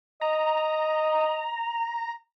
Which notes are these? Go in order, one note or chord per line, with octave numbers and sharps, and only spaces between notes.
D#5 A#5